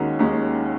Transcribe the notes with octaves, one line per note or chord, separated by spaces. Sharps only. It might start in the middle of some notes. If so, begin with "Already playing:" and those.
Already playing: D#2 D#3 G#3 C#4 F#4
D#2 D#3 G#3 C#4